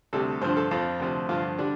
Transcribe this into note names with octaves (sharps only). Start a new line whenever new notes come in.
D2 C3 G3 A4
G2 D3 F3 C5
A4
F2 F3 F4
D2 C3 F3
G2 D3 F3 F4
D3 G3 D4